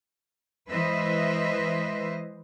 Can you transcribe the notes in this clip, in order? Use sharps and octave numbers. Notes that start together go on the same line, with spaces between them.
E3 G#3 B4 C5 D#5 E5